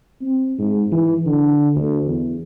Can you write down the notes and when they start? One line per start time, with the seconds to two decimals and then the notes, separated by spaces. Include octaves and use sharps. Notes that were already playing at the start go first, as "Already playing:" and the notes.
0.22 C4
0.58 G#2
0.92 E3
1.26 D3
1.76 D2
2.07 E2